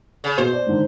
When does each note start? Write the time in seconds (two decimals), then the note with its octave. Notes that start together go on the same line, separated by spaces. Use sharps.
0.24 C#3
0.38 B2 C5
0.53 D5
0.67 G#2 D3 D#3